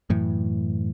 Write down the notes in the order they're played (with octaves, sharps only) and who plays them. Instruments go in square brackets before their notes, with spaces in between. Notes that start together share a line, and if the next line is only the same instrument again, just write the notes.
[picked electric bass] F#2 A2 E3